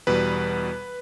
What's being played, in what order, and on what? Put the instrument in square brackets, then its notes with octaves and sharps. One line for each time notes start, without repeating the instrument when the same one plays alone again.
[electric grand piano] E2 B2 G3 B4